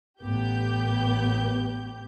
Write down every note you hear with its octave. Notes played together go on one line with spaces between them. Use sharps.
A1 B3 G4 G6